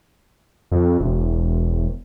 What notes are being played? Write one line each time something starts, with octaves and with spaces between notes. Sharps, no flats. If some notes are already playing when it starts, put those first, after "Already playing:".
F2
E1